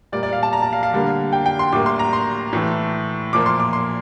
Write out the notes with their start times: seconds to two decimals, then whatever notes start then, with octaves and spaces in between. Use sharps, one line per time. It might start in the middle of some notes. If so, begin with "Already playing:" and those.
0.12 A#2 G3 A#3 D5
0.23 D5
0.33 F5
0.43 A5
0.53 A#5
0.62 A5
0.73 F5
0.83 F5
0.93 D3 G3 A#3
1.33 G5
1.46 G5
1.59 C6
1.73 A2 G3 A#3 D6
1.86 C6
1.99 A#5
2.13 C6
2.53 A2 E3 A3
3.33 A#2 F3 A#3 D6
3.46 C6
3.60 D6
3.73 C6